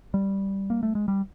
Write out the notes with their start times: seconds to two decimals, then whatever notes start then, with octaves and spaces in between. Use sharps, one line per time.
0.14 G3
0.70 A#3
0.83 A3
0.95 G#3
1.08 G3